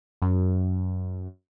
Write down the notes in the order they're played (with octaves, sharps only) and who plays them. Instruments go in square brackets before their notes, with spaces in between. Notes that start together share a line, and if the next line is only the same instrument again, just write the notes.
[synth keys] F#2